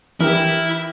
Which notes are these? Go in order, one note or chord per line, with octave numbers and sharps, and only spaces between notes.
E3 E4 G4 A#4 F6